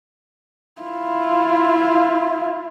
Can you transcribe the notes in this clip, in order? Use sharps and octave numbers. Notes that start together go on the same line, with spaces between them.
E4 F4